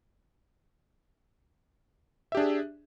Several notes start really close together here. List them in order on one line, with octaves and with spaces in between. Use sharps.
E5 G4 D4 G#4